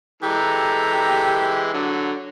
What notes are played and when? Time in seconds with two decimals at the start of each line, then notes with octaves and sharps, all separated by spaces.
0.23 E3 G#3 G4 A4 A#5
1.74 D3 F#3